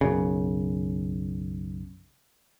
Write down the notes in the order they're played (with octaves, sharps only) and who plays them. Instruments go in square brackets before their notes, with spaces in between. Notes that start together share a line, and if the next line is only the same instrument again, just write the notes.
[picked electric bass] B1 F#2 C#3